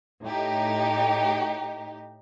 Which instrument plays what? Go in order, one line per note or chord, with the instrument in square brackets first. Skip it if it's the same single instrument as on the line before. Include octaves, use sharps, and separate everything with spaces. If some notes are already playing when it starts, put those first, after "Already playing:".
[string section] A2 D#4 G4